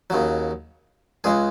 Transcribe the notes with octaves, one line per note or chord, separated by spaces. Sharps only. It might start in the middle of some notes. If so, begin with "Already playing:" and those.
D#2 C#3 F#3
C#2 C#3 G#3 G#4